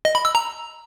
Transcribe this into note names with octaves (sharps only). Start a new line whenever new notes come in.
D#5
B5
E6
A#5